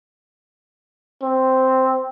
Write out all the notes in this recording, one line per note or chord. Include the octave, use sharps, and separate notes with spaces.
C4